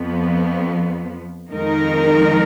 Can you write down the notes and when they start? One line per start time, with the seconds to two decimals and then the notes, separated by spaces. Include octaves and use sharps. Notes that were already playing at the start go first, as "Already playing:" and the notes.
Already playing: F2 F3 B3
1.49 F2 D#3 G#3 D#4 A#4